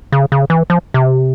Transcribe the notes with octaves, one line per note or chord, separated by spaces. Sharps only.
C#3
C#3
E3
F3
C3